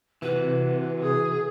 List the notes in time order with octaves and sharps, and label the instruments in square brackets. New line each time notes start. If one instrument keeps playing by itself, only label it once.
[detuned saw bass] C3 [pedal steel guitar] E3 F#4 [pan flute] B4
[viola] G#4